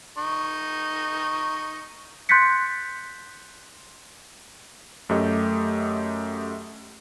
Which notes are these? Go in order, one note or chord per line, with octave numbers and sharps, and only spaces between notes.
D#4 C#6
C6 F#6 G6 A6 B6 C#7
F#2 A3 G4 D#5